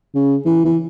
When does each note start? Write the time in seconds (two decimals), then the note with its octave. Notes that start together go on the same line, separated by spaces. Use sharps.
0.14 C#3
0.46 E3
0.65 E3